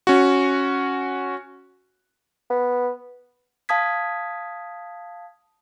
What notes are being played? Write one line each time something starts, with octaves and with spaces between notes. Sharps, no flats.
C#4 F#4
B3
F5 A5 D#6 G#6 B6